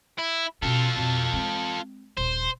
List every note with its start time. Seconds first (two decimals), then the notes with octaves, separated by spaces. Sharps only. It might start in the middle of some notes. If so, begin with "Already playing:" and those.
0.18 E4
0.62 B2 C#4 F4 A4
0.96 F2 B2
1.33 G#3 C4
2.17 D#1 A#1 C5